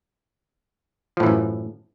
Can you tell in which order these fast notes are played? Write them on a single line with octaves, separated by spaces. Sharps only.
F3 A2 E3 F#2